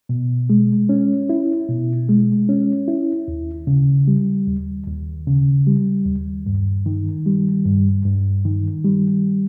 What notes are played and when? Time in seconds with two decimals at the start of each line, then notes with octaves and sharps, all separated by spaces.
0.09 B2
0.50 G#3
0.89 C#4
1.29 E4
1.69 B2
2.09 G#3
2.49 C#4
2.88 E4
3.28 D#2
3.67 C#3
4.08 G3
4.47 D#2
4.87 D#2
5.27 C#3
5.67 G3
6.06 D#2
6.46 G2
6.86 D#3
7.26 G3
7.66 G2
8.05 G2
8.45 D#3
8.84 G3